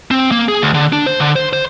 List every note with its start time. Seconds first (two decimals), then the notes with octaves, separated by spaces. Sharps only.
0.11 C4
0.31 A#3
0.49 G#4
0.62 D2
0.74 D3
0.93 D4
1.06 C5
1.20 D3
1.36 C5
1.53 C5